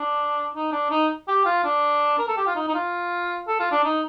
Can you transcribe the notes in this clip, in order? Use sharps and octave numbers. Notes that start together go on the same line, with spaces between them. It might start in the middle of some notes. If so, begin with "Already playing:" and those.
Already playing: D4
D#4
D4
D#4
G4
F4
D4
A#4
A4
G4
F4
D#4
D#4
F4
A4
F4
D4
D#4